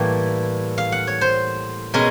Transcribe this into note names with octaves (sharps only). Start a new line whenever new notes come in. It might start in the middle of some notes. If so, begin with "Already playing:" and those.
Already playing: A2 E3 G3 A#3
F5
F#5
C#5
C5
B2 G#3 C#4 A#4